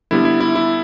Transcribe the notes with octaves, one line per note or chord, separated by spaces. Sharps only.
D3 G3 B3 E4
E4
E4
E4